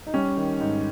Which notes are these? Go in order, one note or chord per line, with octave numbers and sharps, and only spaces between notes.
D#4
G3 C#4
D#3
G#2